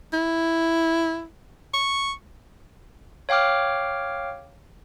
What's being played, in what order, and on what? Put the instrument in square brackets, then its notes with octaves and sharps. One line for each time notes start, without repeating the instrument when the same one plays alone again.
[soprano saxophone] E4
C#6
[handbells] C#5 F5 G5 D6 F6